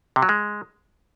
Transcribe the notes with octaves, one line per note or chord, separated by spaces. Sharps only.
C3
F#3
G#3